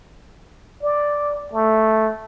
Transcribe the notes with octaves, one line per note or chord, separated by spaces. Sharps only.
D5
A3